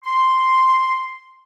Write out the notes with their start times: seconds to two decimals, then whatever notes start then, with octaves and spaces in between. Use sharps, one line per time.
0.04 C6